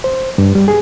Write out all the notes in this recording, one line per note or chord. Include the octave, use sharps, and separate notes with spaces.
C5
G2
G3
G#4